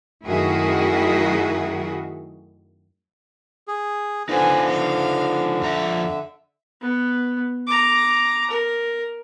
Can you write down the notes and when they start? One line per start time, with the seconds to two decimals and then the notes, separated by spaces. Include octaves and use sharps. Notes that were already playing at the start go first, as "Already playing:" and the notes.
0.24 F#2 D#3 A3 E4 F#4 G#4
3.68 G#4
4.29 D3 D#4 F4 B4 C5 G#5
4.68 F5
5.61 F2 F3 E5 A#5
6.81 B3
7.67 A#5 D6
8.50 A#4